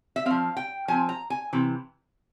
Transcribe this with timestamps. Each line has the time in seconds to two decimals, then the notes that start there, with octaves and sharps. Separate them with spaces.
0.16 E5
0.26 F3 C4 F5
0.57 G5
0.88 F3 C4 G#5
1.09 A#5
1.30 G#5
1.53 C3 E3